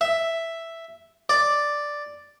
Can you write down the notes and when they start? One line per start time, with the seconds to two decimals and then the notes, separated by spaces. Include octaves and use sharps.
0.01 E5
1.30 D5